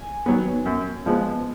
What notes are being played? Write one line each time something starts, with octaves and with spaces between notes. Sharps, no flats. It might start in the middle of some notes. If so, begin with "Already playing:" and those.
Already playing: G#5
D#3 F#3 B3
F#2
F3 G#3 B3